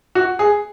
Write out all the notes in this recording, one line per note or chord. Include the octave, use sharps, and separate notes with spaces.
F#4
G#4